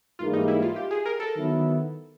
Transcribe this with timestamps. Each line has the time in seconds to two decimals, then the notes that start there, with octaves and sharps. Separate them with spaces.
0.19 G#2 E3 G3 A#3 F4
0.33 D#4
0.48 E4
0.62 F4
0.76 G4
0.91 G#4
1.06 A#4
1.20 A4
1.34 D#3 F#3 B3 E4